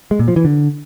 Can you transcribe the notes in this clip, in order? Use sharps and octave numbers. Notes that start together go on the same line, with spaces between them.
G#3
A#2
F3
E3
D3